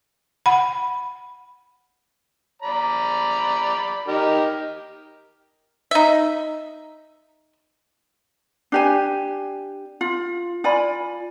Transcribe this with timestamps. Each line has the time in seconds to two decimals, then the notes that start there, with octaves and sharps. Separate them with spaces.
0.46 F#5 B5
2.62 D5 A#5 B5
4.07 D#4 G4 A#4
5.91 D#4 E5
8.72 D4 G4 G#5
10.01 F4
10.64 F4 D5 G#5 B5